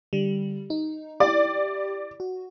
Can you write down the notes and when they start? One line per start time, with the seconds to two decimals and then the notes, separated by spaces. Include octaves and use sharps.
0.13 D3 G3
0.70 D#4
1.20 E4 G4 D5
2.20 F#4